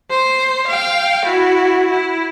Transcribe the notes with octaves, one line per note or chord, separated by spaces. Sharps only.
C5
F5 G5
E4 F#4
E4